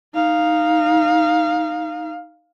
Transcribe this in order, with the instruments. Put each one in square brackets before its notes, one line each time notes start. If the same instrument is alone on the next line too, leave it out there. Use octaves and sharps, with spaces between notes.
[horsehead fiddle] D#4 F5